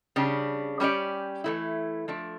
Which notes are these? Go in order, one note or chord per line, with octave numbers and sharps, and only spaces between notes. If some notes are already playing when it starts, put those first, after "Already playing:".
C#3 G3 D4
G3 C#4 G4 D5
E3 A3 E4
F3 A3 D4